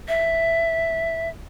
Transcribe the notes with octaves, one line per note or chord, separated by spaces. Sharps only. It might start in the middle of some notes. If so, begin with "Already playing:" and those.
E5